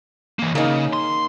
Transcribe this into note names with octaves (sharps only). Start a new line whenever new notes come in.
E3 A#3
C#3 A#3 D#4
C6